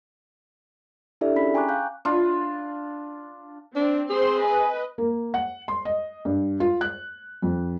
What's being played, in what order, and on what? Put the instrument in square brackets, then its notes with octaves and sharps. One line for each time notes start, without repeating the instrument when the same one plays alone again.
[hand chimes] D4 E4 G4 A4 D5 E5
C#4 G#4 B5 B6
G5 G#5 A#5 C#6 D6 F#6
F5 F#6 G6
[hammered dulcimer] D4 F4
[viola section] C4 [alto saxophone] D4
[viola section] C4 C5 C6 [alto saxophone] G#4
[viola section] B4 D#5 [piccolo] G#5
[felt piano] A#3
F#5
C6
D#5
G2
F4
F#6
F2